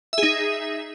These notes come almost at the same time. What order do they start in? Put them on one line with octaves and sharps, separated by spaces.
E5 G#4 D#4